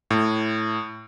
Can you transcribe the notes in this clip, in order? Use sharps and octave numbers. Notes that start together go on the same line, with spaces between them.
A2